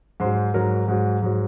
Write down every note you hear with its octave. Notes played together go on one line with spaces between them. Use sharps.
G#2 F#3 C5
G#2 F#3 A#4
G#2 F#3
G#2 F#3